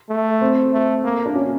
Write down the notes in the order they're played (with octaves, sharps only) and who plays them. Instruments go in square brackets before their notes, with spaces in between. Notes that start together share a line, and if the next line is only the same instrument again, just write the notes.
[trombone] A3
[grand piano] C4
[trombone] A3
A#3
[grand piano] D4
C#4